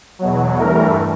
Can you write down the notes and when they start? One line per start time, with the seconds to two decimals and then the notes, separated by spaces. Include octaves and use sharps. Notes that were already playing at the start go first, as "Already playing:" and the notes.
0.19 E2 B2 F#3
0.58 G2 E3 A3 A#4